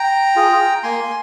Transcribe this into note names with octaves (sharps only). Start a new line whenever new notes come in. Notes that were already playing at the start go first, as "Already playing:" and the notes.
Already playing: G5 A#5
F4 G#4
A#3 G#5 C6